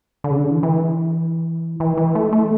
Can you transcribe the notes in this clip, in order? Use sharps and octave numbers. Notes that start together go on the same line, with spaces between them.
D3
C#3
D3
E3
E3
E3
E3
A3
A3